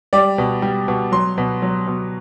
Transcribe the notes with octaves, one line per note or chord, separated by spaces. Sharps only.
G3 D5
B2
G3
B2
F#3 C6
B2
F#3
B2